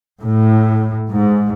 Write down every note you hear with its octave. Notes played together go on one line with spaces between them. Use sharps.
A2
G#2